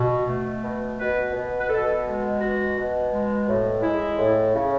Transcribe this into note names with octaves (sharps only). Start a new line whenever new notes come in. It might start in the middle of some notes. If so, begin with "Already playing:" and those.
Already playing: B2
A3
B2
B2 B4
B2
B4
B2 A4
G#3
B2 F#4
B2
G#3
A2
G#3 E4
A2
C#3